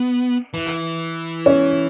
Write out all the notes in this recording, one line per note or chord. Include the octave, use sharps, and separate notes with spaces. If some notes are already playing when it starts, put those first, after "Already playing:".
Already playing: B3
E3
C#4